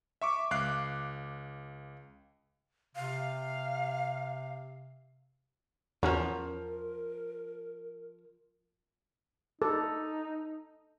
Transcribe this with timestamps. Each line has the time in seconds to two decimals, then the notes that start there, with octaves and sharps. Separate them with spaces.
0.22 E5 C#6 D6
0.51 C#2 F5 D6 F#6 C7
2.96 C3 F5
6.03 E2 F3 C#4 F#4 A#4 A#5
9.62 D#4 A4